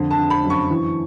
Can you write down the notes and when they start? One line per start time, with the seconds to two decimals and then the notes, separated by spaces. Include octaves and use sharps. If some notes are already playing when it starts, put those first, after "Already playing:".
Already playing: F2 D3
0.11 A5
0.17 D3
0.30 B5
0.44 F#2
0.50 C#6
0.70 E3